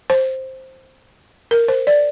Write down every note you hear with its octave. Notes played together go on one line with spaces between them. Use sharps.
C5
A#4
C5
D5